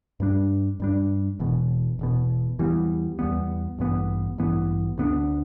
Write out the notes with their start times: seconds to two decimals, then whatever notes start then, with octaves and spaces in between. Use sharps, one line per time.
0.20 G2 G3 D4
0.80 G2 G3 D4
1.39 E1 E2 B2
1.99 E1 E2 B2
2.59 E2 E3 G3 B3
3.19 E2 E3 G3 B3
3.79 A1 G2 E3 B3
4.38 A1 G2 E3 B3
4.98 D2 D3 B3 D4